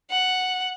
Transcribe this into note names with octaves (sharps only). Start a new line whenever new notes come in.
F#5